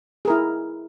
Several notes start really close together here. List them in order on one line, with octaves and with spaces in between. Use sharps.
G#4 A#4 E4